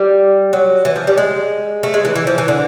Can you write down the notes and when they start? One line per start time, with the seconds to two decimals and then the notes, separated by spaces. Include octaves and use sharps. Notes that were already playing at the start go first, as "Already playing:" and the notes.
Already playing: G3
0.53 F#3
0.85 E3
0.96 F3
1.07 G3
1.18 G#3
1.83 A3
1.94 G#3
2.05 E3
2.15 E3
2.27 F3
2.38 E3
2.48 D3